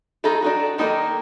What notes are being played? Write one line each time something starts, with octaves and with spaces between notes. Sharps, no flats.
D#4 F4 F#4 G#4 A4
D4 D#4 F#4
D#3 F#3 A#3 D#4 A4